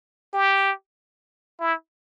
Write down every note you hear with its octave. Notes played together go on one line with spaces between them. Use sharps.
G4
E4